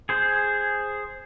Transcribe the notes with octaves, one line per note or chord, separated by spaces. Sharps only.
G#4 C5